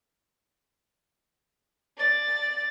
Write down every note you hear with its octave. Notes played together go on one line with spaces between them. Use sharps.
D5 A6